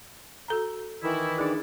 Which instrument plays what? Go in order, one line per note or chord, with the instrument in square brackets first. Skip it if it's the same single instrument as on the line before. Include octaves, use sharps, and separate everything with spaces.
[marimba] F#4 A4 A#5
[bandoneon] D#3 E3 [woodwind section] E4
[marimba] D4 D#4 G#4 [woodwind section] D5